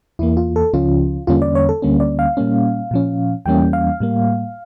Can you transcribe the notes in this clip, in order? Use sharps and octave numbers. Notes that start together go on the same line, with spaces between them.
E2 E3 A#3 E4
F4
A4
C#2 C#3 F3 C#4 F4
E2 D3 G3 A#3 C#4 F4
D5
C#5
A4
D2 D3 G3 A#3 C#4
D5
F5
A#2 G3 A#3 C#4
A#2 F3 C#4
E2 E3 G3 A#3 C#4 G5
F5
A2 G3 A#3